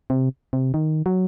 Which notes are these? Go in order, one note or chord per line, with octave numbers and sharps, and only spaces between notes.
C3
C3
D#3
F#3